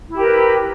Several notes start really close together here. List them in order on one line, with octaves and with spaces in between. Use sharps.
E4 G4 A#4 B4